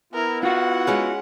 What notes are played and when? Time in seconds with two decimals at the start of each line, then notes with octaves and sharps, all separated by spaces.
0.14 B3 E4 A#4
0.43 F4 F#4 F#5
0.87 G#3 C#4 B4